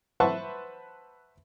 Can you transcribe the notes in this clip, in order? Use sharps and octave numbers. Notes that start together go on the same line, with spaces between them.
B4 C5 E5 F#5 A5 C#6